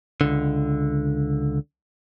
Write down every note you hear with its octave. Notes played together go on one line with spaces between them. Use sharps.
C#2 D3